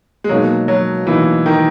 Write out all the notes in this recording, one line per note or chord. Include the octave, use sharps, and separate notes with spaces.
G#3
B2 F#3 A#3 D#4
F#3
B2 E3 A#3 D#4
D#3